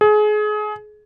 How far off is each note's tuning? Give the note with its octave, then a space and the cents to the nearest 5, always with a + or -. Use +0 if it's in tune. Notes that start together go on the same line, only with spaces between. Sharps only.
G#4 +30